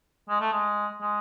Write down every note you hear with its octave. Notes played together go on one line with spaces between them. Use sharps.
G#3
A3
G#3
G#3